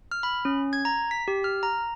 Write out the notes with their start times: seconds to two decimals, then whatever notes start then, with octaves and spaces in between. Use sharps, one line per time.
0.11 F6
0.23 B5
0.45 C#4
0.73 G#6
0.85 A#5
1.11 B6
1.28 G4
1.44 F6
1.63 A#5